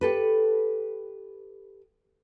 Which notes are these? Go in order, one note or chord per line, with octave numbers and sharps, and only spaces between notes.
G4 A4 B4